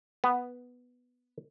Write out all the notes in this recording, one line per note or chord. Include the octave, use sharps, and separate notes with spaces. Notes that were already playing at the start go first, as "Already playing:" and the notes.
B3